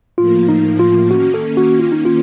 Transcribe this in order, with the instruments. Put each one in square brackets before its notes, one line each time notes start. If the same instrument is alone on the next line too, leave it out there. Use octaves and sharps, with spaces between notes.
[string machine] A2 F3 A#3 [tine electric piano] F4
[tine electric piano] D#4
F4
[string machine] D#3 A#3 C#4 [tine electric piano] F#4
[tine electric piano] A4
F#4
F4
D#4
F4